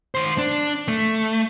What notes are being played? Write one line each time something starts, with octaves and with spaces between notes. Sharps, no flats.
D#3 C5
D4
A3